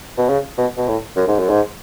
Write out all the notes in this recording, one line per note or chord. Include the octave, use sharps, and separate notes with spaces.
B2
C#3
B2
B2
A2
F#2
G#2
F#2
G#2